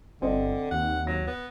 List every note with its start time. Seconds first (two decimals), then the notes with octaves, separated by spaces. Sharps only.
0.22 G1 D3 C4 D5 D#5
0.71 D#2 F#5
1.07 F#3 A#6
1.27 B3